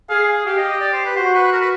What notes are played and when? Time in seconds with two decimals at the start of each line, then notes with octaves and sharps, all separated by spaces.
0.09 G#4 F5
0.45 G4 F5
0.58 D#5
0.69 D#5
0.81 D5
0.93 C5
1.05 B4
1.16 F#4 C5
1.34 B4
1.52 A#4
1.61 B4